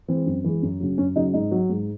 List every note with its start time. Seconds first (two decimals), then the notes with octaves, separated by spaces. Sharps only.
0.08 E3 G#3 C4
0.26 F#2
0.44 E3 G#3
0.62 F#2
0.80 C#3 F#3
0.98 F#2 C#4
1.16 C#3 F#3 D#4
1.34 G#2 D#4
1.52 F#3
1.70 G#2